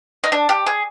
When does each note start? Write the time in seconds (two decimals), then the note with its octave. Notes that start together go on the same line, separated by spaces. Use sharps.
0.24 D#4
0.32 D4
0.49 G4
0.66 G#4